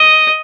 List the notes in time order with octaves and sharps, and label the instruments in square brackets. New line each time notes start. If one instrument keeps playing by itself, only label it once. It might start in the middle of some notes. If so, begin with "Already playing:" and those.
Already playing: [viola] D#5